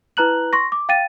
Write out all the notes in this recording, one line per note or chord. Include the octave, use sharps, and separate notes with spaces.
E4 B4 A#5 F#6 F#7
C6 C#6 A#6
D6
F5 G5 A6 D#7